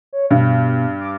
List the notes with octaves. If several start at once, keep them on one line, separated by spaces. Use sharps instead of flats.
C#5
G2 B2
D6